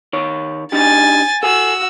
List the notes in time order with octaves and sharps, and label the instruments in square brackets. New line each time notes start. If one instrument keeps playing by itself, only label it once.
[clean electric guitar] D#3 C#5
[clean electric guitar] D4 D#4 G4 [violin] G#5 A6
[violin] F#4 E6 [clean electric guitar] A4 G#5